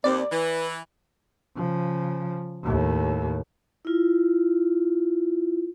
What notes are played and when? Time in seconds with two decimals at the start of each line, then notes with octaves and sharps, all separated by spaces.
0.04 D#2 C4 D5
0.32 E3 B4
1.56 C#3 F3
2.63 D#2 A2
3.85 E4 F4